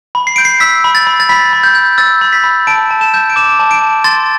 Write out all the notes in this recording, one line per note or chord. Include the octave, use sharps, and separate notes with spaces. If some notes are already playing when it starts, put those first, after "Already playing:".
B5
C7
G6 D7
C7
E6 B6
B5
A6
B5
A6
B5 B6
B5
G6
G6
E6 A6
B5
B6
B5
A5 D7
A5
E7
G6
D7
D6 E7
A5
D7
A5
C6 A6